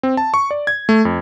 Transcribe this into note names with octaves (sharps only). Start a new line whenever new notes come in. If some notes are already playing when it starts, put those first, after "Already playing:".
C4
A5
C#6
D5
G#6
A3
F2